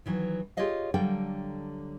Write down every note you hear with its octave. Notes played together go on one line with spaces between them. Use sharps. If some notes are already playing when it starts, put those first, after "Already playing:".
D#3 E3 F#3
F4 G4 G#4 C#5 D#5 F5
D3 F#3 G3 A#3 A4 G5